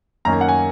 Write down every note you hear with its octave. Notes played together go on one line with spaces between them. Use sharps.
F#2 D#3 A#3 C#4 A#5
G#5
F#5
G#5